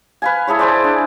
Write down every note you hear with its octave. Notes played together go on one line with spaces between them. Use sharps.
B4 F5 G#5
E4 G#4 A4 C#5
G#4 C5 D5
D4